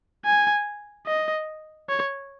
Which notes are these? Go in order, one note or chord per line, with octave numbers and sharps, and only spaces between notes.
G#5
D#5
C#5